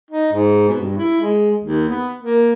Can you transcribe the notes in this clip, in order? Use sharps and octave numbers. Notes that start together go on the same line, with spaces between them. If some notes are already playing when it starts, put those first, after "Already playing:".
D#4
G#2
B2
G2
E4
G#3
D#2
B3
A#3